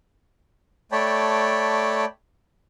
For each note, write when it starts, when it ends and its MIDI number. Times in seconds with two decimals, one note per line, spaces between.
0.92 2.05 57
0.92 2.05 73
0.92 2.05 74
0.92 2.05 79
0.92 2.05 81
0.92 2.05 83